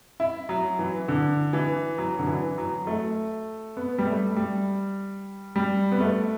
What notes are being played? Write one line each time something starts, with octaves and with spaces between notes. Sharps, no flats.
E4
F#3
E3
D3
E3
F#3
D3
E3
F#3
A3
B3
G3
A3
G3
G3
B3
A3